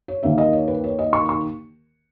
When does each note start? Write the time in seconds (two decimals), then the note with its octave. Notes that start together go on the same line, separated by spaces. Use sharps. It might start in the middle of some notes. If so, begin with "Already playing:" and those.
0.08 C#5
0.23 D#2 D#3 A#3 E5
0.38 D#5
0.53 C#5
0.68 B4
0.84 C#5
0.99 D#5
1.13 C#6
1.29 C#6